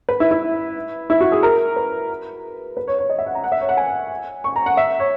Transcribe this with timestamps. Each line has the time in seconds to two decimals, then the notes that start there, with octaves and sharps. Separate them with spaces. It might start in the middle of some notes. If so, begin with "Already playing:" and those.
0.09 B4
0.20 E4
0.31 E4
1.10 E4
1.21 F#4
1.32 G#4
1.43 A#4
1.76 B4
2.77 B4
2.88 C#5
2.99 C#5
3.10 D#5
3.18 E5
3.26 F#5
3.35 A#5
3.44 F#5
3.52 E5
3.61 C#5
3.69 F#5
3.77 G#5
4.44 C#6
4.56 A#5
4.66 F#5
4.77 E5
5.00 C#5